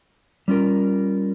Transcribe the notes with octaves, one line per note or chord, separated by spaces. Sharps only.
G3 C#4 F4 A#4